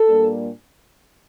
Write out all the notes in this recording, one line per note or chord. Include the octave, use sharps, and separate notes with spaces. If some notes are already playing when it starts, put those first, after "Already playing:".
Already playing: A4
A#2 G3 A#3 D4